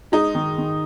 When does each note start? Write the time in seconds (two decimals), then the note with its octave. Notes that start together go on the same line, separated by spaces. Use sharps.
0.12 G#3 D#4
0.35 D#3
0.58 D#3